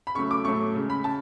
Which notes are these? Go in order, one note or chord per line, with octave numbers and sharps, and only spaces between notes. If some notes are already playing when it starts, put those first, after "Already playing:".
B5
C#3 F#3 A3 C#6
D6
A2 F#3 A3 C#6
C#3 G#3
B5
C#3 A5